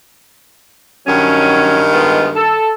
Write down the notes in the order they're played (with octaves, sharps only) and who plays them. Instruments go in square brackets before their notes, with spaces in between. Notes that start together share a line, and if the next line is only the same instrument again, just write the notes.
[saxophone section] G2 D#3 [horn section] F#3 C#4
[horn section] G#3 B3 F4
A4